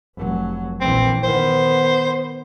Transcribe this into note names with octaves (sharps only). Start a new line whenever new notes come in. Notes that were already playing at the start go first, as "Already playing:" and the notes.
F1 F#3
A#1 E3 C4
D#3 B3 C5